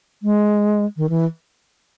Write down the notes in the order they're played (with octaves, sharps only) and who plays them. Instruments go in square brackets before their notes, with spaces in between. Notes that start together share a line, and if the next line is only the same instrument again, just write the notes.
[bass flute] G#3
D#3
E3